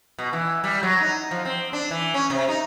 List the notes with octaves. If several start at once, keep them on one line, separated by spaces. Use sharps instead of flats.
B2
E3
G3
F#3
D#4
F3
C4
D4
E3
C#4
C3
D#4